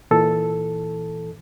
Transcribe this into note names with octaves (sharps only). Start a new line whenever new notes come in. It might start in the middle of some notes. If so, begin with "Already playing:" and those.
A#2 E3 A4